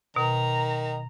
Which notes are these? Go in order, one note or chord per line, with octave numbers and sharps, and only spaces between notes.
B2 D#3 A#5